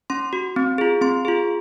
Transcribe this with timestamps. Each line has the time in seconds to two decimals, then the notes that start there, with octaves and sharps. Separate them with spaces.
0.10 C#4 C6
0.33 F#4
0.56 C4
0.78 F4 G#4
1.01 C4 C6
1.25 F4 G#4